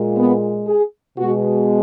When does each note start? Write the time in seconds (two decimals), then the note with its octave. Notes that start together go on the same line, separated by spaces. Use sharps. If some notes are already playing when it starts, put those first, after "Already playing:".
Already playing: A#2 G#3
0.17 B3
0.67 G#4
1.17 B2 G#3 F#4